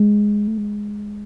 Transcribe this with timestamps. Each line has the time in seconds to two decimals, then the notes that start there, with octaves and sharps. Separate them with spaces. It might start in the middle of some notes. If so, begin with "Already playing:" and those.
Already playing: G#3
0.48 A3
0.58 G#3